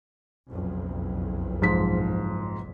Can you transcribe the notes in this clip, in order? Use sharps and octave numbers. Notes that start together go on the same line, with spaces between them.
F#1 B1 F2
G#2 F3 B6